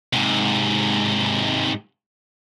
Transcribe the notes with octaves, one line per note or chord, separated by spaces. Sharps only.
G#2 C3